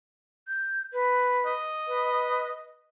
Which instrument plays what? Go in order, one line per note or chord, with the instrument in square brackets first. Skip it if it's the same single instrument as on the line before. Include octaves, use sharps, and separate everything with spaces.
[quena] G6
B4
[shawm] D#5
[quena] B4